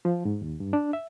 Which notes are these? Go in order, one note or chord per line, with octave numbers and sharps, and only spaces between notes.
F3
G#2
D#2
G2
D4
E5